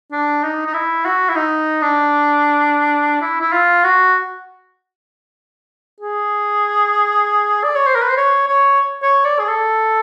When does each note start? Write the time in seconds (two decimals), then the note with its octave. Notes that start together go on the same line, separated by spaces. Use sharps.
0.12 D4
0.43 D#4
0.66 D#4
0.73 E4
1.05 F#4
1.29 E4
1.35 D#4
1.82 D4
3.21 E4
3.41 E4
3.53 F4
3.84 F#4
6.00 G#4
7.64 D5
7.75 C#5
7.87 C5
7.95 A#4
8.02 B4
8.09 C5
8.17 C#5
8.48 C#5
9.03 C#5
9.25 D5
9.39 G#4
9.48 A4